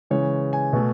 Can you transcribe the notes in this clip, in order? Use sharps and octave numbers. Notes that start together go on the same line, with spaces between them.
C#3 E3 G#3 C#5
G#5
B2 A3